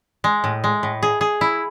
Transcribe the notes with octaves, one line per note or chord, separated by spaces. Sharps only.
G#3
A2
G#3
A2
G#4
G#4
E4